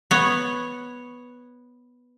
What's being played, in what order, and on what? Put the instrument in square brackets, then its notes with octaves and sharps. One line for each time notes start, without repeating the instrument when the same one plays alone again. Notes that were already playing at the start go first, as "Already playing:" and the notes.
[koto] B3 C#5